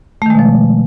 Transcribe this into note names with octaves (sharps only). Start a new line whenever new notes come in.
B2 D#3 F3 G#3 A3